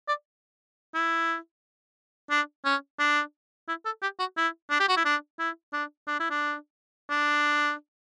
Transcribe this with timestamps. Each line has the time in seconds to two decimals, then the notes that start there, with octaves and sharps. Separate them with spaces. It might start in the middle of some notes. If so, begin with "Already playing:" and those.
0.08 D5
0.94 E4
2.30 D4
2.65 C#4
2.99 D4
3.68 E4
3.85 A4
4.02 G4
4.19 F#4
4.37 E4
4.70 D4
4.80 G4
4.89 F#4
4.97 E4
5.05 D4
5.39 E4
5.73 D4
6.08 D4
6.20 E4
6.30 D4
7.10 D4